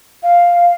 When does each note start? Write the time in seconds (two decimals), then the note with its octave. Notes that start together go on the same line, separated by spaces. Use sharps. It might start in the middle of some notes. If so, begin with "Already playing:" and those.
0.22 F5